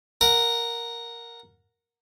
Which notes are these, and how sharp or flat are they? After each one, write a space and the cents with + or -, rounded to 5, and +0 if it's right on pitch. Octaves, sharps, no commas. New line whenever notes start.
A#4 +0 F#5 -15